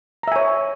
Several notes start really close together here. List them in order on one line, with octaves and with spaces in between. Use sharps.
A#5 E5 G#5 C#5